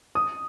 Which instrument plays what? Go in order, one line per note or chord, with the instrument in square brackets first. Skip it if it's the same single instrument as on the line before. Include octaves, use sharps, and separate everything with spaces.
[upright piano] D#6